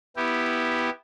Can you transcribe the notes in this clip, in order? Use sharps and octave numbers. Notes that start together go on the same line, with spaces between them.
B3 E4 G4